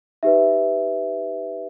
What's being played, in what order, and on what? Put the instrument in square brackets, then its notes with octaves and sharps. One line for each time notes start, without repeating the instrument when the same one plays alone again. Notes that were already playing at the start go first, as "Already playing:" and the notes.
[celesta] D#4 G4 B4 E5